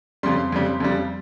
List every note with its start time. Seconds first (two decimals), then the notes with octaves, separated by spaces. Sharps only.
0.23 F2 C#3 G3 C6
0.52 F2 C#3 G3
0.80 F2 C#3 G3